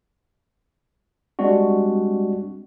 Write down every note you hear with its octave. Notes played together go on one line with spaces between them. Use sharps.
G3 G#3 C4 D4 F#4